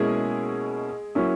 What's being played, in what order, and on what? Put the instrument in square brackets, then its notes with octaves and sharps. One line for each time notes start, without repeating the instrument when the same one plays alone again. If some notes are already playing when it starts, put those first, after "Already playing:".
Already playing: [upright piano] B2 A#3 C#4 E4 [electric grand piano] G#3 G#4
[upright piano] F#3 A#3 C#4 E4